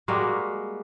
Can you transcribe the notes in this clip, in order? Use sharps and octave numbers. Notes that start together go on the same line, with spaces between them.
G3 G#3 A#3 F#4